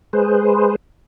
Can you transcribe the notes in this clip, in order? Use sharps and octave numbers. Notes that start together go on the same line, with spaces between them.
G#3 G#4 B4 C5